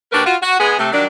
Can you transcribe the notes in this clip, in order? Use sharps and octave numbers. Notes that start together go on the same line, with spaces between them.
D#2 D4 F#4 G4 A#4 B4
F4 F#4
F#4
G#3 B3 G#4
C3 A3
D#3 F#3 G3 D4